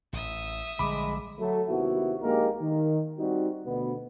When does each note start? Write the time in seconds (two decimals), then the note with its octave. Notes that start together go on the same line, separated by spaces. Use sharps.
0.13 A1 E5 D#6
0.79 A#1 D3 G3 G#3 B5 D6
1.40 F#3 A3
1.69 D#2 C3 B3 E4 F#4
2.22 A#1 G#3 A#3 D#4 G4 A#4
2.62 D#3
3.19 G3 C4 D#4 F#4
3.65 D2 B2 B3